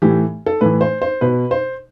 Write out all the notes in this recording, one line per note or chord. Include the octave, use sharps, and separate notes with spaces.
A2 E3 G4
A4
A2 E3 B4
C5
C5
B2 B4
C5